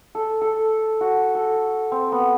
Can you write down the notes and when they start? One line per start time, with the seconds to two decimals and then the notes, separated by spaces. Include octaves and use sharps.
0.15 A4
0.42 A4
1.01 F#4
1.35 A4
1.92 C4
2.12 B3